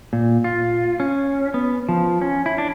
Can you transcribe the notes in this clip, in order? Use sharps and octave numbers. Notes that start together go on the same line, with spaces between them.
A#2
F4
C#4
B3
F3
C#4
E4
D4